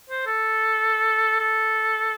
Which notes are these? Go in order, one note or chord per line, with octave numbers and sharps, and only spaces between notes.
C5
A4
A4